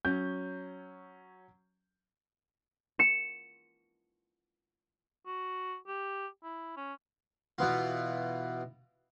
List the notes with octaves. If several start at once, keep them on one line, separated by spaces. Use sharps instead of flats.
F#3 C#4 G6
C#7 E7
F#4
G4
E4
C#4
B2 E3 B3 F4